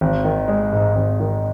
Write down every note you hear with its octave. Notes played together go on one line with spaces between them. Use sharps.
G#1
D#3
G#3
G#2
G#1
D#3